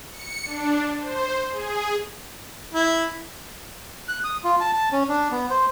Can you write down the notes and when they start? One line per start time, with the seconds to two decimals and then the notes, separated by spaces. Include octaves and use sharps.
0.12 C#7
0.45 D4
1.00 C5
1.51 G#4
2.73 E4
4.08 F#6
4.24 D#6
4.44 F4
4.61 A5
4.73 A5
4.92 C#4
5.08 D4
5.31 B3
5.50 C5